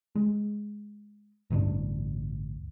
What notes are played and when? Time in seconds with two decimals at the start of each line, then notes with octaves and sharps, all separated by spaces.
0.15 G#3
1.50 A1 D2 G2 D4